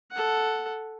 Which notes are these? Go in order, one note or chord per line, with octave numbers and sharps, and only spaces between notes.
A4 F#5